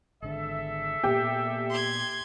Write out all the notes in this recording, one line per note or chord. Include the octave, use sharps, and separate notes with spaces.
G#1 D3 G#4 A4 E5
A#2 A#3 B3 G4
C6 G#6